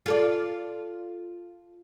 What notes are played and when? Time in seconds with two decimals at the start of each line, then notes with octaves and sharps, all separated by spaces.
0.06 F4 A4 D5